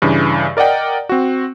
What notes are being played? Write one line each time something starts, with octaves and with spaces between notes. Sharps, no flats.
G2 C#3 E3
A#4 D5 D#5 F#5 G5
C4 F#4